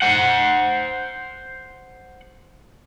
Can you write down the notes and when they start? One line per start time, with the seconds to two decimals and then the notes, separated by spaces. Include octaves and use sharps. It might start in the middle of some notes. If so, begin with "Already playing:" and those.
0.02 C5 F#5